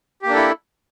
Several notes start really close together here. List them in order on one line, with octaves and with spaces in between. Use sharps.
G4 A#3 D4 A4 E4